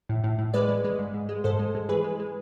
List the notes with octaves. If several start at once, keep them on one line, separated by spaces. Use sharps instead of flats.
A2
A2
A2
G#3 B4 D5
G#3
G#3
G#2
G#2
G#3
G#2 A4 C5
G#3
G#3
E3 G#4 B4
G#3
G#3